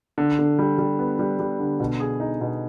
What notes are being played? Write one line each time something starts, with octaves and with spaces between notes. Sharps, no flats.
D3
D3
G3
G3
B3
G3
G3
D3
B2
G#4
D#4
B2